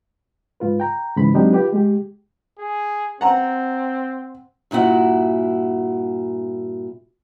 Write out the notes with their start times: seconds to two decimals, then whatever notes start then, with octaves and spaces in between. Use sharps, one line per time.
0.60 G#2 F4 B4
0.80 G5 A#5
1.17 G#2 C#3 E3 B5
1.34 F#3 G#3 C4 D4 D#4 G4
1.53 F4 G4 B4
1.73 G#3 G4
2.59 G#4
3.21 C4 F#5 A#5
4.71 G2 A#2 E4 F#4 F#5